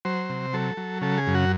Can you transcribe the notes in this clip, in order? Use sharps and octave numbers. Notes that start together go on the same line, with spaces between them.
F#3 C5
C3
F#3 A4
F#3
C#3 A4
G#4
F#2
F#4